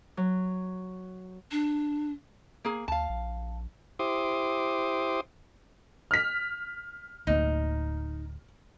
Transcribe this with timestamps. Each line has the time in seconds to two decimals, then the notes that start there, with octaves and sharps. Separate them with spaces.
0.17 F#3
1.52 D4
2.65 A#3 G#4
2.88 D2 F5 A5
3.09 A#1
3.99 E4 G4 C5 C6 D6 D#6
6.11 F6 B6
7.27 D1 D2 A#3 D#4